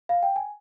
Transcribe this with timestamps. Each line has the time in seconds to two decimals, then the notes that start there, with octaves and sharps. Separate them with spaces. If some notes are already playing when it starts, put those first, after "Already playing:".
0.09 F5
0.23 G5
0.36 G#5